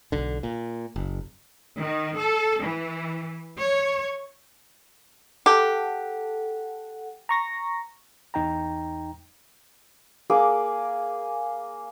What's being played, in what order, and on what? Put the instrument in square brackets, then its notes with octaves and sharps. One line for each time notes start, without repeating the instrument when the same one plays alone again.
[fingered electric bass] B1 D3
A#2
F#1
[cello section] D#3
A4
E3
C#5
[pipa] G4 [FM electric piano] A4 F#5
[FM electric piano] A#5 C#6 A#6
[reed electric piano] E2 D#4 G5 A#5
[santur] A#3 G#4 D6